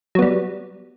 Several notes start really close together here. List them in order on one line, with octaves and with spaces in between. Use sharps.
F#3 B3 G3